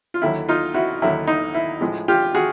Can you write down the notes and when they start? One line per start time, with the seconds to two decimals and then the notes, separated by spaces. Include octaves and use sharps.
0.14 F4
0.22 D#2 D3 F#3 E4
0.49 D#4 F4
0.74 E4 F#4
1.02 D#2 D3 F#3 E4
1.27 D#4
1.55 E4
1.81 A2 F3 G#3
2.08 F4 G4
2.35 F#4 G#4